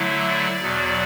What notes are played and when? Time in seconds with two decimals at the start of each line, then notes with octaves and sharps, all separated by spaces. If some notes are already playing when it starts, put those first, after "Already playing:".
Already playing: D3 F#3 A3 E4
0.27 D5
0.62 E2 B2 F#3